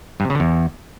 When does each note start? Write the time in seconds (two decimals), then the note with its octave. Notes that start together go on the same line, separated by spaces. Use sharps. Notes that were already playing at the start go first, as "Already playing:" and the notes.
0.20 G2
0.25 C3
0.30 C#3
0.35 D3
0.40 E2